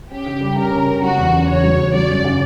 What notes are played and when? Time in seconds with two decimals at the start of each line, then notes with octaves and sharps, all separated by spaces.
0.10 C#4 G4
0.26 C#3
0.41 G3
0.56 C#3 A#4
0.71 C#4
0.87 C#3
1.02 F#3 F#4
1.17 E2
1.33 C#3
1.48 E2 C#5
1.64 F#3
1.79 E2
1.94 F#3 D5
2.09 F#2
2.25 C#3